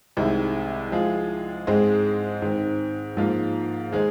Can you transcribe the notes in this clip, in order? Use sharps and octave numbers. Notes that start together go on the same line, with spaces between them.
C2 C3 D#3 G#3
F3 G#3 F4 G#4
G#2 G#3 C4 G#4 C5
G#2 D#3 C4
G#2 F3 A#3 F4 A#4
D#3 G#3 D#4 G#4 C5